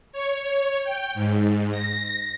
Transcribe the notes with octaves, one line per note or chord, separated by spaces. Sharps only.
C#5
G5
G#2
A#6